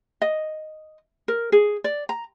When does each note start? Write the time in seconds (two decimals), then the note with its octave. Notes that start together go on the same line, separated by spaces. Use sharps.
0.22 D#5
1.28 A#4
1.52 G#4
1.84 D5
2.09 A#5